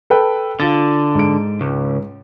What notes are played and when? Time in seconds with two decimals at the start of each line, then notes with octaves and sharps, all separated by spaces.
0.10 A4 B4 G5
0.60 D3 F4 A6
1.15 G#2 D7
1.61 C#2